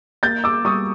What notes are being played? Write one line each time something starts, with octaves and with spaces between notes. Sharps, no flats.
A#3 G6 A6
D6 E6
G3 C#6 D#6